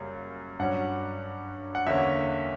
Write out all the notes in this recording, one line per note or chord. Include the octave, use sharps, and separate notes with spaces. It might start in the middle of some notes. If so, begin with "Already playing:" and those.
Already playing: F#2 C#3 G3 A#3 C#4
G2 F#3 C#4 F#5
F#5
E2 D3 A#3 C#4 E5